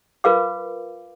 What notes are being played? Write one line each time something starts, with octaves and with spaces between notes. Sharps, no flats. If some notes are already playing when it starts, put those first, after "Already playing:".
F4 A#4 B4 F5 D6